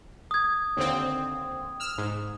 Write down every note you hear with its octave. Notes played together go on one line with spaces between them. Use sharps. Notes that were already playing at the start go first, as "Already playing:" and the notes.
D#6 G#6
D#2 D3 C4
E6 F6
G#2